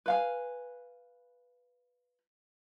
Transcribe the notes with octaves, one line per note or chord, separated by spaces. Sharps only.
B4 F5 G#5